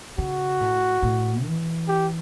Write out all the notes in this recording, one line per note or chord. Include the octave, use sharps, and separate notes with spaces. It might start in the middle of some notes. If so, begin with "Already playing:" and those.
C#3 F#4
A2
A2
E3
G4